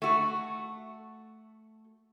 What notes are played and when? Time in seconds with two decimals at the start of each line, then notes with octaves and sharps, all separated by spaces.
0.02 A3 F#4